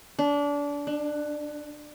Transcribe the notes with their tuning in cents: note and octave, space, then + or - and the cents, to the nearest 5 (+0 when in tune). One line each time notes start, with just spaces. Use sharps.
D4 -25
D4 +20